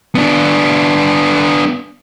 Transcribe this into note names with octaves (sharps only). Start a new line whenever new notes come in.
B3 D4